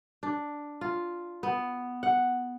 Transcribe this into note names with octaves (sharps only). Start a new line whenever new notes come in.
D4
F4
B3
F#5